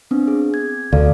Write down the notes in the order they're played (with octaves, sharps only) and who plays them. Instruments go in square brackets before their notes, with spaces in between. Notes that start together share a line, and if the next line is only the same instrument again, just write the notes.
[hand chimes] B3 C4 D4
G#4
G#6
[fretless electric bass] D2 [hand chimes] A4 D5 F5